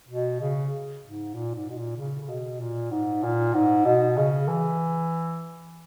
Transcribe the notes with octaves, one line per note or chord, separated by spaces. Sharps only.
B2
C#3
G#2
A#2
G#2
B2
A#2
C#3
C#3
B2
A#2
G#2
A#2
G#2
B2
C#3
E3